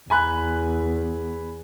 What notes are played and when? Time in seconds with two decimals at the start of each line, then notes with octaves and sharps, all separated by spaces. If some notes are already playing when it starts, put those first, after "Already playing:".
0.10 E2 G#5 B5 F#6